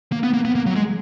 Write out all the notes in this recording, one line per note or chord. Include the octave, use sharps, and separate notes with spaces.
A#3
B3
A#3
B3
A#3
F#3
G#3